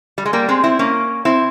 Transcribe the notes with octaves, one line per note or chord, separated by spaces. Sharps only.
G3
G#3
G3 A#3
G#3 C4
C4 E4
A#3 C#4
C4 E4